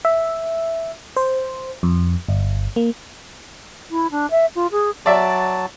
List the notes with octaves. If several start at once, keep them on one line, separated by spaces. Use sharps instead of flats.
E5
C5
F2
G1
A#3
E4
D4
E5
F4
G#4
F#3 D5 E5 A5